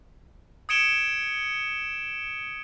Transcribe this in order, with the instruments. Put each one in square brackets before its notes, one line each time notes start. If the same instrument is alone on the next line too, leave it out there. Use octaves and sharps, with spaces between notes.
[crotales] D#6 G#6 C#7 D7 E7 G7